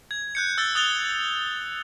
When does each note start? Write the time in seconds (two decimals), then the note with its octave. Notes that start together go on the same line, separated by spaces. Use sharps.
0.11 G#6
0.35 F#6 G6 C#7
0.58 E6 A6 G7
0.75 D#6 F#6 A6 F7 G7